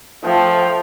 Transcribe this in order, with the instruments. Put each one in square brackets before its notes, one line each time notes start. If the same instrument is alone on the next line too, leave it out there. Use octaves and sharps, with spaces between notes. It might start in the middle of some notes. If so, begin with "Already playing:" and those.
[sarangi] F3 [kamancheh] A3 G5